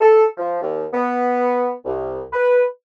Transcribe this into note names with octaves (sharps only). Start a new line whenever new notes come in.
A4
F3
D#2
B3
C2
B4